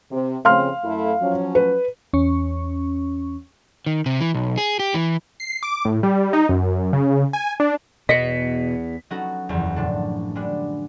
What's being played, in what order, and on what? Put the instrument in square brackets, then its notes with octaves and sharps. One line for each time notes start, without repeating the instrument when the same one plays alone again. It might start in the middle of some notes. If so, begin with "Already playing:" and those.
[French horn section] C3
[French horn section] F2 C#3 C4 [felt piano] F5 C6 F6
[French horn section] F#2 A3 E4
F3 F#3 C#4
[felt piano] B4
[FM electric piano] E2 C#4 C#6
[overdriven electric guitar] D#3
C3
E3
B1
G#4
G4
E3
[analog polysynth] C7
D6
A2
G3
D#4
F#2
C#3
G#5
D4
[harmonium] E2 [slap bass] B2 [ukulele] D#5 [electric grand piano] B6 C#7
[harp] F#3 B3 C#4 D#4 F#4 A4
F#1 E2 F3
A2 D3 D4 A4
G3 G#3 B3 D4